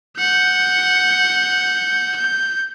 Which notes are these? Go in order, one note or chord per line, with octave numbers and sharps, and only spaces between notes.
F#5 G6
G6